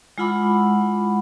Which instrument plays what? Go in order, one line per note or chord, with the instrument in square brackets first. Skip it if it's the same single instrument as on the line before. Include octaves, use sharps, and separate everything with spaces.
[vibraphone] G#3 E4 F4 F#5 B5 D6